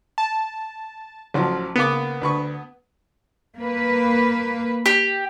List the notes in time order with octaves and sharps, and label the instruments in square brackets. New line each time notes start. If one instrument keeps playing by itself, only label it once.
[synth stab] A5
[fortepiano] A1 F3 F#3
[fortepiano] C#2 A#3 D6 [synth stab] B3
[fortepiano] D2 B4 C#6
[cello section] A#3 B4
[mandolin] G4